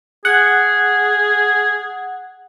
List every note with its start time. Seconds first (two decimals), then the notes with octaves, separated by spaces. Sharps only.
0.25 G#4 F#5